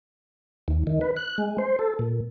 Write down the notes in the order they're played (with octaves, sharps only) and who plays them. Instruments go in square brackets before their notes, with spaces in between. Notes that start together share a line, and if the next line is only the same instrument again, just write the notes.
[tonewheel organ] D#2
D#3
B4
F#6
G#3
C5
A4
A#2